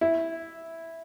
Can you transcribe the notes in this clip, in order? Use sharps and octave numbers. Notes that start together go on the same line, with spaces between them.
E4